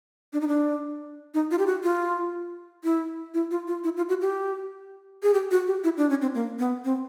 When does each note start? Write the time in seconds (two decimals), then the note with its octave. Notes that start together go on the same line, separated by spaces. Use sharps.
0.33 D4
0.41 D#4
0.48 D4
1.34 D#4
1.51 F4
1.58 G4
1.67 F#4
1.83 F4
2.84 E4
3.34 E4
3.51 F4
3.67 F4
3.84 E4
3.97 F4
4.09 F#4
4.21 G4
5.23 G#4
5.34 G4
5.51 F#4
5.67 G4
5.84 E4
5.97 D4
6.10 C#4
6.22 C4
6.35 A#3
6.59 B3
6.85 C4